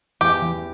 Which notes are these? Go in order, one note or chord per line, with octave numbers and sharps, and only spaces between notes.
E2 G4
E3